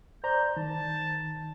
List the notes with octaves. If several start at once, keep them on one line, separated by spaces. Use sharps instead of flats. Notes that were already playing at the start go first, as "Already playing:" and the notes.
C5 D5 A#5 G6
D#3 A5